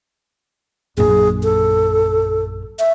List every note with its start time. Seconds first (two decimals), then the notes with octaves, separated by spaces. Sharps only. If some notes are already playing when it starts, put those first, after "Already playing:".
0.98 A#1 F#2 G#4
1.43 A4
2.79 E5